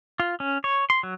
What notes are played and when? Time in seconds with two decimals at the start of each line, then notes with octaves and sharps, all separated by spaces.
0.20 F4
0.40 C#4
0.64 C#5
0.90 C6
1.03 F#3